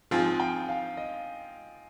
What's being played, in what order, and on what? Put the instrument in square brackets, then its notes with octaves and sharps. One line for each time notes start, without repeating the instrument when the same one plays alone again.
[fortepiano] G#2 F3 C4 F4 [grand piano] G#5
[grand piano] G#5
G5
F5
D#5